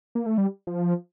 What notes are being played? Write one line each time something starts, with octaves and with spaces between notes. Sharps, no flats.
A#3
A3
G3
F3